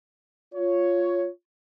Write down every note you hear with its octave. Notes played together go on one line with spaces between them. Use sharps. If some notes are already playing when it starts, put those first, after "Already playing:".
F4 C#5